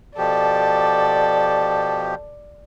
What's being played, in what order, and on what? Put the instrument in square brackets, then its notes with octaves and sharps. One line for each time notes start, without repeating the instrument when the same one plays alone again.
[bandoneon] B2 F3 G4 [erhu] A4 [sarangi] D5